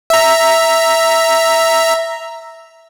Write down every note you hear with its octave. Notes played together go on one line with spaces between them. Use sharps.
E5 A#5